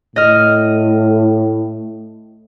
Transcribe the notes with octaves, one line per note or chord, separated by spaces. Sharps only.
A2 D#5 F6